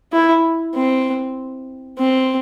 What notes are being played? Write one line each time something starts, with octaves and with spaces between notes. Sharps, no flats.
E4
C4
C4